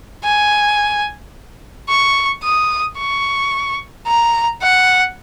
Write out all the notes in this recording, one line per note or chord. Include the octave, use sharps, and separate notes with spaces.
G#5
C#6
D#6
C#6
A#5
F#5